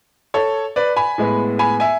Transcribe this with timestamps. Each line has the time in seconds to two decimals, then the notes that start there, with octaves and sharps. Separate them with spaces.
0.34 A4 C#5
0.76 B4 D5
0.96 G#5 B5
1.18 A2 G#3 B3
1.59 G#5 B5
1.80 E5 G#5